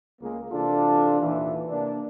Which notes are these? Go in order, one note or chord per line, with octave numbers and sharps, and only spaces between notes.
C#2 G#3 A#3
C3 E3 D4 F4 A4
D#2 A#2 E3
C3 A#3 D4